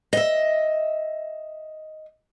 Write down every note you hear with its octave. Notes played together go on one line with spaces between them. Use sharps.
D#5 E5